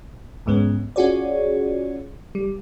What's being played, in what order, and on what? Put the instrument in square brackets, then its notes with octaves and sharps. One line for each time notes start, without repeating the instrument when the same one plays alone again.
[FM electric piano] D2 G#2 G#3 B3 C#4
C#4 F4 F#4 G#4 C#5 D5
G3